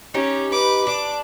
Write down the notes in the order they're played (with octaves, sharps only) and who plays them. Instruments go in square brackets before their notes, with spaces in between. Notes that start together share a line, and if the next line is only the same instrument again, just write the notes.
[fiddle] C#4 [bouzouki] D#4 G4
[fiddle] B4 D6
[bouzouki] D4 [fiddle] D6